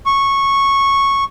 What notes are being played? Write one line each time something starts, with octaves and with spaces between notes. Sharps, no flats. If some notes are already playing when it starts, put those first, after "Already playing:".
C#6